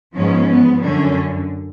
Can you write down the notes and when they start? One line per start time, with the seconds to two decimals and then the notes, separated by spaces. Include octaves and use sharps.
0.15 G#2 F3 G#3 B3 C#4
0.49 B3
0.83 F#2 D3 C#4